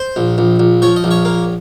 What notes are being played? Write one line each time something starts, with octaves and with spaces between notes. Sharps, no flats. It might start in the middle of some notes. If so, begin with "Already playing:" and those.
Already playing: C5
A#1
A#1
A#1
F3 C#5
D#5
A#1
C#5
A#3